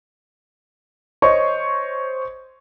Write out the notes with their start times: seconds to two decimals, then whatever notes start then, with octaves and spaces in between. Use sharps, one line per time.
1.22 C5 C#5 D#5 C#6